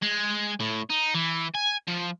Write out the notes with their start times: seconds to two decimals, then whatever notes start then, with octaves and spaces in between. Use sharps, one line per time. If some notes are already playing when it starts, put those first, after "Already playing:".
0.02 G#3
0.60 A2
0.90 D#4
1.14 E3
1.54 G#5
1.87 F3